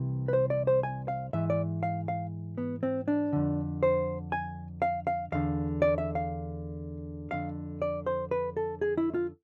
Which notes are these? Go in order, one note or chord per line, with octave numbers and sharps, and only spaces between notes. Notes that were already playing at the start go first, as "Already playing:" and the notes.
Already playing: C2 C3 E3
B4
C5
D5
C5
G#5
F5
G#2 E3 E5
D5
F5
F5
B3
C4
D4
F2 D3
C5
G#5
F5
F5
E2 D3 F5
D5
E5
F5
F2 D3 F5
D5
C5
B4
A4
G#4
E4
F4